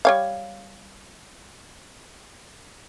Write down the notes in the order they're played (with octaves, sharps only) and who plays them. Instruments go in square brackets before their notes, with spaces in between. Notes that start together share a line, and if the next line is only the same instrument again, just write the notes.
[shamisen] G3 C#5 F5